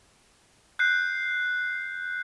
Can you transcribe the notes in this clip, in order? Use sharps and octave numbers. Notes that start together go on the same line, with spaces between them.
F#6 G6 C7